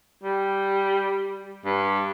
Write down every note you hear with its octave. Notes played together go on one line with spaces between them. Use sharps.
G3
G2